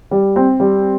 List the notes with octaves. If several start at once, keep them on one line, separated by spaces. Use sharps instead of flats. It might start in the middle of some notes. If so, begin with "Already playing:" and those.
G3
C4
G3